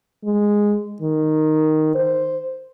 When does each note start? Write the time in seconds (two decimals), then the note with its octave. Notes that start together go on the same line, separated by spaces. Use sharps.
0.24 G#3
1.02 D#3
1.95 C5